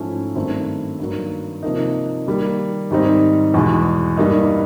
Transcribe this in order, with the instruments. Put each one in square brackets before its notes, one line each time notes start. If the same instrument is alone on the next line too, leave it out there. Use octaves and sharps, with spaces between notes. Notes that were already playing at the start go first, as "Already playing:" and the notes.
Already playing: [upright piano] G#2 F3 A3 C#4 E4
G2 D#3 F#3 A3 C4
G2 D#3 F#3 A#3
C3 F3 A#3 D#4
D#3 G3 A#3
G#2 D#3 G3 C4 D#4
E2 B2 G#3
G2 E3 G3 A#3 D#4